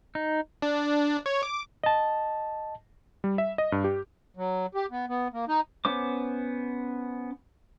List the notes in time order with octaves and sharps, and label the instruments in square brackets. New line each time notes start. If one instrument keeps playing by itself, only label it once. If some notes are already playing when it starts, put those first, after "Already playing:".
[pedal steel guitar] D#4
[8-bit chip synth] D4
C#5
D6
[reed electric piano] D#5 A5
[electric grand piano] G3
E5
D#5
G2
G4
[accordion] F#3
G4
B3
B3
A#3
D#4
[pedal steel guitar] B3 C#4 C5 D6